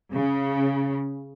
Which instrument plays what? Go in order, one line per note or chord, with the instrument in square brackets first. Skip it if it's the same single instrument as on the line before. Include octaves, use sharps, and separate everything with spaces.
[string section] C#3